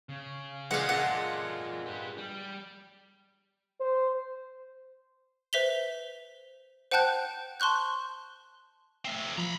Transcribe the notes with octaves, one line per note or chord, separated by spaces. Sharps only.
C#3
A#2 G#3 F5 F#5
F4 A4 F#5
G4 B4
G3 G4
C5
B4 C5 E5 B6 F7 G7
C5 F#5 G5 A5 F#6 G6
A5 C6 C#6 F#6 G6
A3 C4
F3 A#5 B5